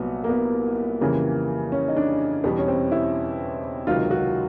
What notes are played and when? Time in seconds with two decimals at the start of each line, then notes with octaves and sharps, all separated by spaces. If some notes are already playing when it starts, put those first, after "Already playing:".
Already playing: C2 A#2 F#3 B3
0.24 A#3
0.29 B3
1.01 F2 C#3 E3 G3 A#3
1.72 C#4
1.88 D#4
1.97 D4
2.44 E2 B2 G3 B3
2.58 C#4
2.68 C4
2.92 E4
3.87 C#2 C3 D#3 F#3 F4
4.11 F#4